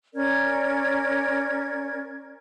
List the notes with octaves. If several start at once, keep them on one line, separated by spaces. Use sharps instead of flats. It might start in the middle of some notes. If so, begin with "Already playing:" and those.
C#4 A#4 D5 G#6